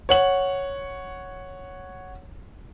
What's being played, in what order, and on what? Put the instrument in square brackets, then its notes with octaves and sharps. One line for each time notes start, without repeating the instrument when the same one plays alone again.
[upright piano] C#5 F#5 F#7